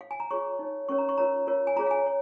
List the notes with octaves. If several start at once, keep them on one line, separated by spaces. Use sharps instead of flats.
F5
G#5
A#5
F4 G#4 C#5 C#6
D#4 C#5
C#4 A#4 C#5 C#6
A#5
C#6
F4 A#4 C#5 A#5
F4 A#4 C#5
G#5
F4 G#4 C#5 A#5
F5
G#5
C#5